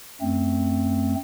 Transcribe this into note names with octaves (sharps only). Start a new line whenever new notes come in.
F#2 A3 C4